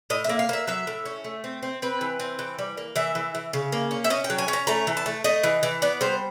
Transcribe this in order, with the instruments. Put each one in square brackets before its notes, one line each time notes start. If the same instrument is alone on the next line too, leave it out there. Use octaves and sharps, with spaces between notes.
[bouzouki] A2 D#5
A#3 E5
F5
A#3 E5
F#3 E5
A2
C#4
A3
C4
C4
C4 B4
E3
C4
E3
G3
A#3
E3 E5
E3
E3
C#3
A#3
C#4
E5
C#4 D#5
G5
F#3
G#5
C#4
A#5
A3 A#5
E3
A5
A3
A3 D#5
E3
E3
B3 D5
G3 C5